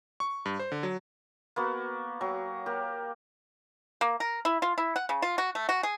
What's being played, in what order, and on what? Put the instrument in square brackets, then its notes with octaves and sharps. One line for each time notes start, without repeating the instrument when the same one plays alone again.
[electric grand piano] C#6
G2
C5
D3
F#3
[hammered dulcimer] A#3 B3 F#4
F#3 G4 A#5
A#3 G4
[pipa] A#3
A#4
E4
F4
E4
F#5
C#3
F4
F#4
A3
F#4
G#4